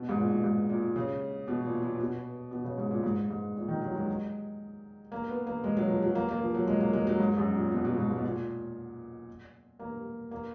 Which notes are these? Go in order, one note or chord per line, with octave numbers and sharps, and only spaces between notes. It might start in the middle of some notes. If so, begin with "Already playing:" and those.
Already playing: B2
G#2
A#2
G#2
A#2
C#3
B2
A#2
A#2
B2
B2
C#3
G#2
A#2
G#2
G#2
A#2
D#3
F#3
G#3
A#3
B3
A#3
G#3
F#3
F3
F#3
A#3
A#3
F3
F#3
G#3
A#3
G#3
F#3
G#2
F#2
A#2
B2
B2
G#2
G#2
B2
A#2
A#3
A#3